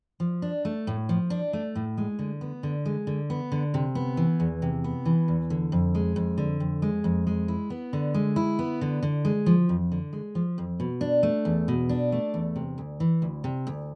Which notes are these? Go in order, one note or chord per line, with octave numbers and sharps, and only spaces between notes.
F3
D4
A3
A2
F3
D4
A3
A2
G#3
D3
B3
D3
G#3
D3
B3
D3
C3
B3
E3
E2
C3
B3
E3
E2
D3
F2
G#3
F2
D3
F2
G#3
F2
G#3
E4
B3
D3
G#3
E4
B3
D3
D3
G#3
F3
F2
D3
G#3
F3
F2
B2
D4
A3
E2
B2
D4
A3
E2
C3
D2
E3
D2
C3
D2